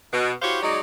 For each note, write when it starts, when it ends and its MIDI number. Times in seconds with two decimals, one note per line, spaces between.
0.12 0.31 47
0.42 0.59 64
0.42 0.59 66
0.42 0.59 67
0.42 0.59 72
0.42 0.59 73
0.42 0.59 77
0.62 0.81 54
0.62 0.81 56
0.62 0.81 63
0.62 0.81 73
0.62 0.81 74